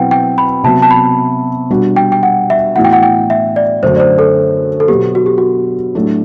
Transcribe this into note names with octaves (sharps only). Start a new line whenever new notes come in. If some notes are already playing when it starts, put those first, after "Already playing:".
Already playing: B2 F#3 C4 E4 B4 F#5 G5
G5
B5
C3 F#3 B3 A5
A5
B5
B2 G3 D4 F#4
G5
G5
F#5
E5
A2 E3 B3 F#4 F#5
G5
F#5
G5
E5
D5
F#2 D3 A3 D4 F#4 C5
D5
C5
A4
A4
B2 F#3 B3 G4
F#4
G4
F#4
A2 F#3 A3 D4